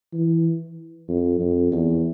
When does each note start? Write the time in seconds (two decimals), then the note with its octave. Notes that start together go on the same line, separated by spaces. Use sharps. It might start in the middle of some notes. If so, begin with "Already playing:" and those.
0.13 E3
1.08 F2
1.40 F2
1.72 E2